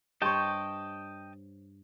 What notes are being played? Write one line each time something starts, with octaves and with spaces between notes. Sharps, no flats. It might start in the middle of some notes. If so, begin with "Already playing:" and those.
G2 C5 C#5 D#5 G5 A5